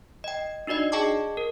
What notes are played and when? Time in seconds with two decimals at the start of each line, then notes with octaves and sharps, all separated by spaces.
0.24 D#5 G5
0.67 D4 D#4 F#4 D5 D#5
0.92 G#4 D#5 G5 A5 C#6 D6
1.37 A#4